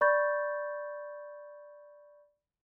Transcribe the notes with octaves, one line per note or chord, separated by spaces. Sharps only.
D5 B5 C#6 G6 A6